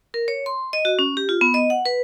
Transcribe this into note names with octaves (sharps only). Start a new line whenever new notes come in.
A#4
C#5
C6
D#5
F#4
C#4
G4
F4
B3
D#5
F#5
B4